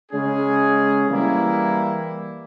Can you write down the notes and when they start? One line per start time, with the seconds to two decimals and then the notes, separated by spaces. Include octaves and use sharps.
0.11 C#3 G#3 C#4 G#4
1.08 E3 G3 A#3 E4